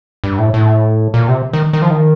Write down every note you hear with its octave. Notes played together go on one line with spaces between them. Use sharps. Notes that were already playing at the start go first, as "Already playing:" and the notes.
G2
A2
A2
A#2
C3
D#3
D#3
F3
D#3